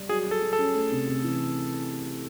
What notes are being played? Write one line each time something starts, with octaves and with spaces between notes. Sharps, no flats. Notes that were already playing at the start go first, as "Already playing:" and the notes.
Already playing: G3
F#3 G#4
F#3
A4
F#3
A4
C#4
A3
C3
C3
E3